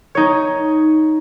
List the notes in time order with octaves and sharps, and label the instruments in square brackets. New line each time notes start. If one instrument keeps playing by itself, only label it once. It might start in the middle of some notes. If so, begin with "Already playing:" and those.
[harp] D#4 C#5